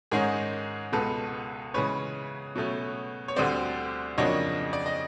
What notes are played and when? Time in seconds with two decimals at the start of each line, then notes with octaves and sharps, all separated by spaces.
0.11 G#2 D#3 G#3 C#4 G#4 A#4
0.92 C#2 B2 G#3 A4 B4
1.74 C#3 E3 G#3 C#4 B4 C#5
2.56 B2 F#3 A3 C#4
3.28 C#5
3.36 D2 D3 G3 C4 C5 D5
4.18 F2 C#3 F#3 A#3 D4 C#5 D#5
4.73 D5
4.86 D#5